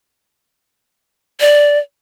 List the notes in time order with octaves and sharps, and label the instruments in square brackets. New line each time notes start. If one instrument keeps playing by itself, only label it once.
[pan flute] D5